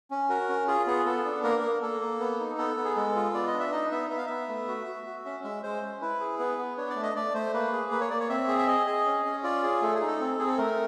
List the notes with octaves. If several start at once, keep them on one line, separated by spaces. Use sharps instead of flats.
C#4
F#4 A#4
C#4
F4 G#4
B3 G#4
B3 A4
D4
A#3 A#4
A#3
A#3 A4
A#3
B3
D#4
B3 A4
B3
G#4
G#3 A4
F4
B3 D5
D#5
D4
E5
D#4 D#5
B3 E5
B3 E5
F5
B3 E5
A3
F#4
F#4
F#4
C#4 E5
G#3 E5
G#3 C5
C#4
E4 B4
G#4
B3 B4
B3
D4 C#5
D5
A3
D#5
A3 D5
A3 C5
A#3 B4
G#4
A#3 B4
C#5
A#3 D5
C#5
C4 E5
G#4
E5
G#4 D#5
G#4
C#4
C#4
F4 D5
G#4
A3 A4
G#4
D#4
A4
C4
C4 G#4
A4
A3 A#4